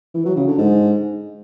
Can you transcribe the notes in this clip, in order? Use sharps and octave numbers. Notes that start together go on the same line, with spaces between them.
E3
F#3
C#3
D3
G#2